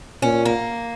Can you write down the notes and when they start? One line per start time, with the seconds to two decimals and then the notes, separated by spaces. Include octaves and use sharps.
0.22 A#2 C#4
0.45 A#3